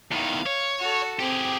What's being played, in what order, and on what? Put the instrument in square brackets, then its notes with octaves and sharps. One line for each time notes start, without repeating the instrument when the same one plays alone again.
[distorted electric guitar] E2 D#3 [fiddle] F5
[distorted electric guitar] C#5
[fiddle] F#4 A4
[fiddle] C4 [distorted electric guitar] G4 G#4